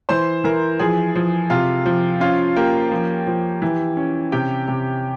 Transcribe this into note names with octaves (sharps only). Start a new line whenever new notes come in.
E3 C5 C6
E3 A#4 A#5
F3 G#4 G#5
F3
C3 F4 F5
F3
C#4 F4 F5
A#3 G4 G5
F3
F3
E3
C#4
C3 G4 G5
C3